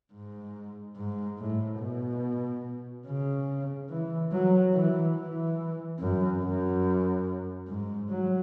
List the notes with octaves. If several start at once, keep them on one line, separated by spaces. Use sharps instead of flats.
G#2
G#2
A2
B2
C#3
E3
F#3
E3
E3
F#2
F#2
G#2
F#3